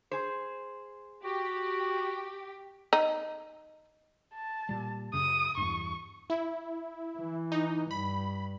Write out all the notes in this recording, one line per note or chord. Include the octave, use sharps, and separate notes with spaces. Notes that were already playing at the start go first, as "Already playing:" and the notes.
G#4 C5
F#4 G4
D#4
A5
A#2 G3
F#2 C#3 D#6
E2 G2 C#6
E4
E3
D#4
G2 B5